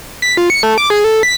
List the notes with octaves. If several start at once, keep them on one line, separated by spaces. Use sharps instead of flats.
B6
F4
C#7
A3
D6
G#4
A4
B6